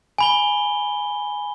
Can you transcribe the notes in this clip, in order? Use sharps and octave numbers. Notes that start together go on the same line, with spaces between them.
G#5 B5 G7